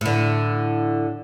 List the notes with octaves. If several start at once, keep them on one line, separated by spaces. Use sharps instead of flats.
A2 D3